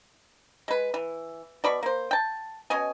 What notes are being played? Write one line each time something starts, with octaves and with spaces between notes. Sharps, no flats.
G#3 B4
E3
B2 D5 B5 C#6
A#3 C5
G5 A5
B2 C#4 D#5 G#5